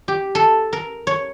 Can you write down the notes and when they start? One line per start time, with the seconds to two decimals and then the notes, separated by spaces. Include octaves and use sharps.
0.08 G4
0.35 A4
0.73 A#4
1.07 C#5